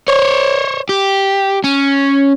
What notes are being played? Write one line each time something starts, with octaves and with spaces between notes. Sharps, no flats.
C5 C#5
G4
C#4